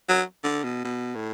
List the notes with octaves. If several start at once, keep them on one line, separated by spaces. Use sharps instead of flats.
F#3
D3
B2
B2
A2